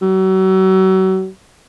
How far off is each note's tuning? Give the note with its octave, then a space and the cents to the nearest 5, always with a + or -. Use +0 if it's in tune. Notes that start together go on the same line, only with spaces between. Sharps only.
F#3 +35